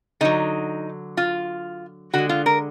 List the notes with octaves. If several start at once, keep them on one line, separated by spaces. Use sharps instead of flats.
D3 F#3 D#4
F4
D3 G#3 F#4
F4
A#4